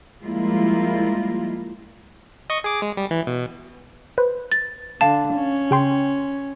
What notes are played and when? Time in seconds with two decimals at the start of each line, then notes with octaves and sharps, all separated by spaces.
0.23 F3 G3 G#3 A#3 E4 F4
2.50 D#5 C#6
2.64 G#4 D6
2.82 G#3
2.97 G3
3.11 E3
3.27 B2
4.18 B4 C5
4.52 A6
5.01 D3 F5 A5 A6
5.35 C#4
5.71 C#3 G5 C6